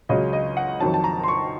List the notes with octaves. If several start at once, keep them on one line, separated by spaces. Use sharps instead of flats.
C#2 C#3 F#3 D#5
D#5
F#5
F2 D#3 F#3 A5
A5
A#5
C6
C#6